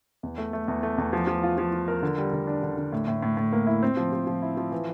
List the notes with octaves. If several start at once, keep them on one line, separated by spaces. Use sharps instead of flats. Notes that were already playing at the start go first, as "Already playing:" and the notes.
E2
A3
A3
E2
A3
E2
F3
F3
F4
F3
F4
A#4
D3
G3
D3
D4
D3
D3
A2
A2
A2
A2
A#3
E4
C4
F3
F3
F3
E4
F3
E3